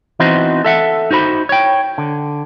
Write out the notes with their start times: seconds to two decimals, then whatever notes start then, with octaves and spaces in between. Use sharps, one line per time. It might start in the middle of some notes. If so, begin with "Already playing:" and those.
0.20 E3 B3 C4 D#4 F#4 C5
0.64 A4 E5 F#5
1.11 D#4 F#4 C5 B5
1.49 C#5 G5
1.98 D3